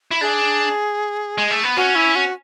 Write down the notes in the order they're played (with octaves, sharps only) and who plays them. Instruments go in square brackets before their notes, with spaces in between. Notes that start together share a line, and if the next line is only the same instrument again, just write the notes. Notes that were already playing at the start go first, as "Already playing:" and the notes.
[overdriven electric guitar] E4
[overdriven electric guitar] D4 [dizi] G#4
[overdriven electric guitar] G#3
A3
B3
[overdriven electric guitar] C#4 [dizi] F#4
[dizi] E4
F#4